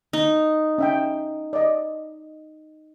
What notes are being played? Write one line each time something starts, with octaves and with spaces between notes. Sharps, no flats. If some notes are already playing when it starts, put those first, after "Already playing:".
D#4
C#4 E5 G5
D5 D#5